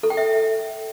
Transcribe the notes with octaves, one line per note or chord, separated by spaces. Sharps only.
A4
G5
E5